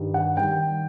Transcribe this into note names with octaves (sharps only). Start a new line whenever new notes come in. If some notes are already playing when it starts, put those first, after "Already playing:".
Already playing: G2 D#3 G3
F#5
D#3 G3 G5